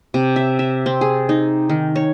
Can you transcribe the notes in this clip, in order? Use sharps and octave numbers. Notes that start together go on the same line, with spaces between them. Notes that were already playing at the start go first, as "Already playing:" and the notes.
C3
E5
E5
C4
G#4
D#4
D#3
C#5